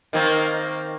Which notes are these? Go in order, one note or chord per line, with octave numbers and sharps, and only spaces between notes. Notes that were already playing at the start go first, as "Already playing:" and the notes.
D#3 A#3 C4